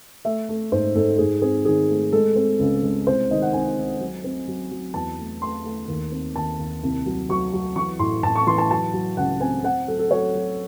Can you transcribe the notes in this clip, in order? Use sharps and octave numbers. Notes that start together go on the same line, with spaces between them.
A3 E5
A3
G#2 C5
G#2 A4
G#2 G#4
C4 G#4
D#3 G#4
A3
G#3 A4
C4
C#2
G#3
C2 C5
D#3 D#5
F#5
C2 G#5
D#3
F#3
C4
F#3
F#3
E2 A5
A3
A3 C6
A3
D#2
C4
D#2 A5
D#2
C2
F#3
F#3 C#6
F#3
E3 C#6
A2 C6
A2 A5
C#6
E3 C6
A5
F#3 A5
F#3
C#2 F#5
C4 G#5
C4 F#5
F#3 A4
A4
F#3 C#5
F#3